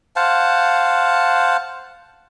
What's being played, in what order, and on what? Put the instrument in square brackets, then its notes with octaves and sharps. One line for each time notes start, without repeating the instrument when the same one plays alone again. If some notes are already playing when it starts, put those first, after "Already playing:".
[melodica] C5 F5 F#5 A5